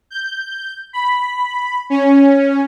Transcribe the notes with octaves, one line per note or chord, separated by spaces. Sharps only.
G6
B5
C#4